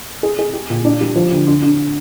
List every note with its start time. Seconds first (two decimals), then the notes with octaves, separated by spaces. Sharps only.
0.23 G#4
0.39 G#4
0.53 G4
0.70 A#2
0.85 D4
1.01 G3
1.16 F3
1.32 D2
1.47 D3
1.62 D3